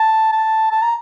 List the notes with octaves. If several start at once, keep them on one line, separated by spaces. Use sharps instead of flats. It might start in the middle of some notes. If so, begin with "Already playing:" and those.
Already playing: A5
A5
A5
A#5